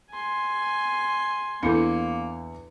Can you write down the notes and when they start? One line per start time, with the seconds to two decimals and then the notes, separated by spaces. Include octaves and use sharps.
0.11 G#5 C6
1.63 E2 A#3 D4 E4 A4 C#7